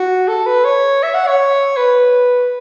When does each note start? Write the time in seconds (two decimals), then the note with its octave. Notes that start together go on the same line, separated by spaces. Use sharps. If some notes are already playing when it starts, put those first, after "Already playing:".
Already playing: F#4
0.28 A4
0.47 B4
0.65 C#5
1.03 E5
1.15 F#5
1.27 C#5
1.77 B4